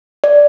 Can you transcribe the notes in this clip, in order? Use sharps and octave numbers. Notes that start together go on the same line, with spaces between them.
D5